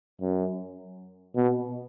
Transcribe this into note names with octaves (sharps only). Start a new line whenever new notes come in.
F#2
B2